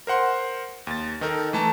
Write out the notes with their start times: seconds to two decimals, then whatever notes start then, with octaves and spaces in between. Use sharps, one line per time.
0.07 A#4 C5 F#5 C6
0.87 D#2 A6
1.21 D#3 D#4 A4 A#4
1.53 E3 A3 A5 A#5